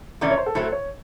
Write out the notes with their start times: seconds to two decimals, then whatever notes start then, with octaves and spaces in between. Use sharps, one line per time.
0.21 C3 E3 A3 C#4 D5
0.30 C#5
0.38 C5
0.46 A4
0.55 A2 F#3 A3 C5
0.72 C#5